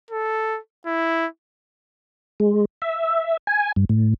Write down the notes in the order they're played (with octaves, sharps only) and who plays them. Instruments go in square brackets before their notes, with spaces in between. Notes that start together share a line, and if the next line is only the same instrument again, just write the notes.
[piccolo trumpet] A4
E4
[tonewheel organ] G#3
E5
G#5
G2
A2